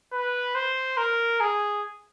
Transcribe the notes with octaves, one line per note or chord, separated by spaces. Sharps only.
B4
C5
A#4
G#4